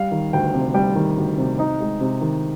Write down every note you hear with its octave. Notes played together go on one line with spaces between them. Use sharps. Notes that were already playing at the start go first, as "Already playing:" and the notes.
Already playing: G3 F5
D#3
D2 G5
C3
G3 G5
D#3
D2
C3
D#4
G#3
C3
D#3